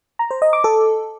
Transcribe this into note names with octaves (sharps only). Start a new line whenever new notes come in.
A#5
C5
D#5
D6
A4